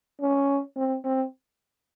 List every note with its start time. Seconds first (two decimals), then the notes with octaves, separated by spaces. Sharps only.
0.21 C#4
0.76 C4
1.04 C4